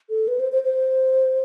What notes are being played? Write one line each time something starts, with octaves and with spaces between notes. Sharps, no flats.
A4
B4
C5
C5
C5